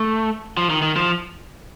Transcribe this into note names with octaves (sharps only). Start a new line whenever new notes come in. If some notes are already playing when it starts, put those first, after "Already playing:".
Already playing: A3
F3
D#3
D#3
F3